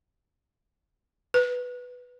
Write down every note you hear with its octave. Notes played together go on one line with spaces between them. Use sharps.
B4